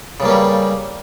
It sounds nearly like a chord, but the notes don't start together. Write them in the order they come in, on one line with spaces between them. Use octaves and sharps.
C#3 G2 A#3 C#4 G3